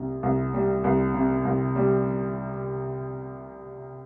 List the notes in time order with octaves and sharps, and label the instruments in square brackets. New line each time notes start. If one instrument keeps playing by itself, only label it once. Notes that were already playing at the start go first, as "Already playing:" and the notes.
Already playing: [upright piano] C2 C3
C2
G3
C2
C3
C2
G3